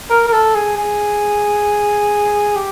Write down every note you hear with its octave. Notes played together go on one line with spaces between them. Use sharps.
A#4
A#4
A4
G#4
G#4
G4